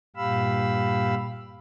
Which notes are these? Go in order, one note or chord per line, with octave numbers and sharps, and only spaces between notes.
G2 A#2 G4 F5 B5 E6